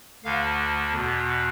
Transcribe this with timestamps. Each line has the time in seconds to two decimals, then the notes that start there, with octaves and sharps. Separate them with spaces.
0.24 D2 D3 F5
0.93 E2 B2